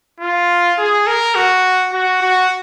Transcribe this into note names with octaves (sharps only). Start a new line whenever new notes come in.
F4
G#4
A#4
F#4
F#4
F#4